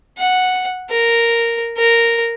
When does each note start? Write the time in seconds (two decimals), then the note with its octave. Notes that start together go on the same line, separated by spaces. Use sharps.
0.19 F#5
0.90 A#4
1.78 A#4